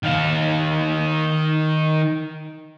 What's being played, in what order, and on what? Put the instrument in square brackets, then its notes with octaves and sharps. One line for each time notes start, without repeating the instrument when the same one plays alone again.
[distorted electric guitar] D#3 F5